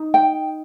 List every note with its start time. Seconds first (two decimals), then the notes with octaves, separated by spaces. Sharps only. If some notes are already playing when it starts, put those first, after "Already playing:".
Already playing: D#4
0.14 G5